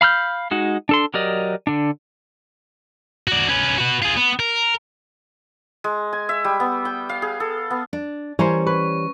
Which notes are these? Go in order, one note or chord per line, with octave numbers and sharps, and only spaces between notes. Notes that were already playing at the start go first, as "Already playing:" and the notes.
F5 B5 F6 G6
G#3 D#4 F#4
D4 A4 C6
F#3 G4 A#4 D5 D#5
D3 D4
F#4 D5
C#4 B4
F#4 B4
F4 G#4
B3
A#4
G#3
G#5
E5
G3
B3
G5
F5
G#4
A4
B3
D4
E3 G3 C#4 A#4 C5 C#5
B4 C#6